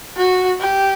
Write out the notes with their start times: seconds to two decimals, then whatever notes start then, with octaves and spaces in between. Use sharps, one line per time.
0.17 F#4
0.60 G4